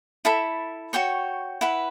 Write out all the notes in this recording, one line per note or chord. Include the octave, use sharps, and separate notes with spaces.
E4 A4 E5 B5
F#4 C#5 G5 C#6
E4 B4 F#5 B5